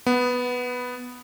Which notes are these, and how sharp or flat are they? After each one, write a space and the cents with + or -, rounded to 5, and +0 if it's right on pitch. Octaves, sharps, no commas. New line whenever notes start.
B3 +0 F#5 +0